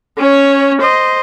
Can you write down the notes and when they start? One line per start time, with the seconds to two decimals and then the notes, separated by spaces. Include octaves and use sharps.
0.18 C#4 C#5
0.81 C5 D#5